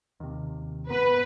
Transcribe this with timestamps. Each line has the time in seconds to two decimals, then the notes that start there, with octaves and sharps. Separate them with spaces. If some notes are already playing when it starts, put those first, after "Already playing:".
0.20 D#2 C3
0.90 F1 G#2 B3 B4